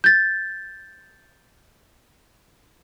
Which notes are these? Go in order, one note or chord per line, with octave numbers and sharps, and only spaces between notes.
G6 A6